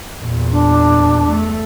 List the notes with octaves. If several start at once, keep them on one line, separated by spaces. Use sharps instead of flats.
E2 A#2
D4
A3